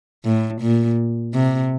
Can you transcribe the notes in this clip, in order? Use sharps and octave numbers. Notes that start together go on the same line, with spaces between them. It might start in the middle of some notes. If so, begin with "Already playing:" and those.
A2
A#2
C3